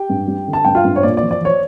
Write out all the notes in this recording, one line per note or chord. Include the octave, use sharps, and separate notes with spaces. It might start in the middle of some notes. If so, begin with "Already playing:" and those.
Already playing: G4 G5
G2
G3
D3
A5
G2 G5
F4 F5
G2
C#5
A#2 D5
D5
F3
D5
F3 C#5